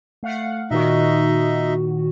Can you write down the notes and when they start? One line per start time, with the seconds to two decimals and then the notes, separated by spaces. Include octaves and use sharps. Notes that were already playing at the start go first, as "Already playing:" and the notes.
0.23 A3 F5 F#5
0.71 A#2 D#3 D#4 F#4 D#5 E5